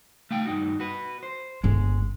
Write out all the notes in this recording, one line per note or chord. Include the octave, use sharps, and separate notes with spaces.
A3 F5 G5
G2 D#4 F#4
F#4 B4
C5
G1 G#3 C#4